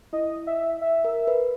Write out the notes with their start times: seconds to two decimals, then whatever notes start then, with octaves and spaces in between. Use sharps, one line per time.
0.13 E4 D#5
0.47 E5
0.81 E5
1.04 A#4
1.27 B4